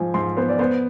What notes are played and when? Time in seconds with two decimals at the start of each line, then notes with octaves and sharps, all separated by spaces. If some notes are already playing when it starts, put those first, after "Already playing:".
Already playing: G#2 F3 G#5
0.14 G#2 C6
0.37 B3 C5
0.49 D5
0.59 B3 C5